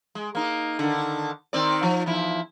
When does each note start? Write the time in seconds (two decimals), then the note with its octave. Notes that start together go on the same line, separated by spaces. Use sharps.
0.15 G#3
0.35 A#3 D#4
0.79 D3 D#3
1.53 D#3 C4 D5
1.83 F3
2.06 E2 F3 E4